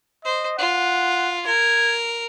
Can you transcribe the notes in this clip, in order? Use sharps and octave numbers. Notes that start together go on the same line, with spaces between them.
C5 D#5
F4 F#5
A#4 G#6